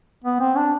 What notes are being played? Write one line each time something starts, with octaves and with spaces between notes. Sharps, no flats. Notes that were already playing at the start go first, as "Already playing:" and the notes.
B3
C4
D4